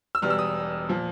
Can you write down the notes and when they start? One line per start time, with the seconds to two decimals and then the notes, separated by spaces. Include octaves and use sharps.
0.15 E6
0.22 E1 E2 B2 G3 F6
0.30 E6
0.39 D#6
0.89 A#2 F3